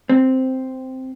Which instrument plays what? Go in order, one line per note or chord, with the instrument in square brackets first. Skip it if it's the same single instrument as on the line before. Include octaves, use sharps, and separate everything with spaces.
[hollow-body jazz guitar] C4